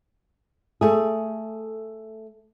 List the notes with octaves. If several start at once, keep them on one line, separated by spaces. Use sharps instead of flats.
A3 G#4